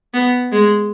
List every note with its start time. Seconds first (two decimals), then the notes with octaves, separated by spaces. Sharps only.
0.14 B3
0.53 G#3